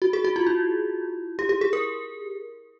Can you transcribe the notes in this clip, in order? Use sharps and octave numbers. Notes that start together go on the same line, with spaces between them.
F#4
G#4
F#4
F4
E4
G4
G4
G#4
A#4